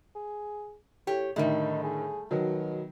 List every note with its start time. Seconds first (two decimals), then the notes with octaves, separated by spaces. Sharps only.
0.15 G#4
1.07 A2 G4 C#5
1.36 A2 D3 D#3 G3 A3 D#4
1.83 G#4
2.31 B2 D#3 F#3